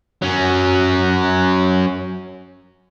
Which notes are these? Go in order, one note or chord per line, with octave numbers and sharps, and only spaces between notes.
F#3 C#4